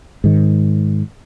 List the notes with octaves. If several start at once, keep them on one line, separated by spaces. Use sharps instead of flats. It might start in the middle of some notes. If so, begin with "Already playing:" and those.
G#2 D#3